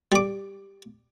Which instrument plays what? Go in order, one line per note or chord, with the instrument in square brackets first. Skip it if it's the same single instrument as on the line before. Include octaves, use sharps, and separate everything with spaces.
[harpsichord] G3 D6